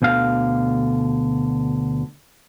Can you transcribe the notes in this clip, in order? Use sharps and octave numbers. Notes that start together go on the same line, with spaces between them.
D2 B2 D3 F5